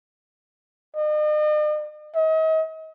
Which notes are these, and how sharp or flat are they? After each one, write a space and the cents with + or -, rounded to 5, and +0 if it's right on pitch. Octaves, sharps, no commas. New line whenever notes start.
D#5 -45
D#5 +40